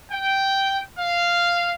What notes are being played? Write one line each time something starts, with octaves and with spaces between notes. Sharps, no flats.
G5
F5